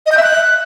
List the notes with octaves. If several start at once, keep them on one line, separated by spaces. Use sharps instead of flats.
D#5
G6
E5
F#6